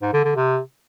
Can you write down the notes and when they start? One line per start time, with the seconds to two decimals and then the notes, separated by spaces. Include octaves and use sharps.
0.02 G#2
0.13 D3
0.24 D3
0.36 C3